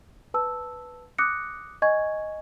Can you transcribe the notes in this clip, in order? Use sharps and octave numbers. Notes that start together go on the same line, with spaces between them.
B4 A5 E6
D6 D#6 F#6 A#6 C#7
D#5 G#5 C#6 G#6